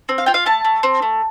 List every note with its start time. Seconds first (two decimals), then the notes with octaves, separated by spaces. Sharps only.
0.09 C4
0.18 F5
0.26 F4 G5
0.34 F5
0.46 A3 A5
0.65 A3
0.83 C4
1.02 A3